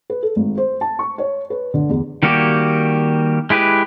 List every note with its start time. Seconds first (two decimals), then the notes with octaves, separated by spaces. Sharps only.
0.10 B4
0.23 A4
0.36 G#1
0.58 C5
0.81 A5
0.99 C#6
1.18 C#5
1.50 B4
1.74 D3
1.89 E2
2.23 D#3 G3 A#3 F#4 G4
3.50 G#3 E4 G4 B4